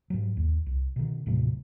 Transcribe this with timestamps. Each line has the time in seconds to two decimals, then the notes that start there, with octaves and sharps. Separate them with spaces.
0.10 G#2 F#3
0.37 D#2
0.66 C2
0.96 B2 D#3
1.26 D#1 A2 C3 F#3